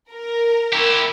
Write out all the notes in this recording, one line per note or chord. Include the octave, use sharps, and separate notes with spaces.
A#4
E4 G4